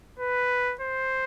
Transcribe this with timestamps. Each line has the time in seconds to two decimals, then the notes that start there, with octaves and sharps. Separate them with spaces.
0.19 B4
0.81 C5